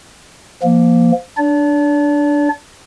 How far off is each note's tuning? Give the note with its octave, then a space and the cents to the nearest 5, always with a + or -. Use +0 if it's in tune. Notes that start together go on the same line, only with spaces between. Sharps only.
F3 -20 A#3 +10
D4 +0 D5 -40